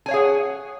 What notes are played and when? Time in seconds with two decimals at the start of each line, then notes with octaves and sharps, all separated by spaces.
0.06 G#5
0.08 C#5
0.11 F5
0.14 G#4
0.16 F#5